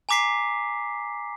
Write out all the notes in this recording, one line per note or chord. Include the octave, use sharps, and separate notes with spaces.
G#5 A#5 D6 B6 C7